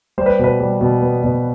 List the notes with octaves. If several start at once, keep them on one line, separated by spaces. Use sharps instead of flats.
G3 C5
B4
B2 B4
G3
B2
B3
B2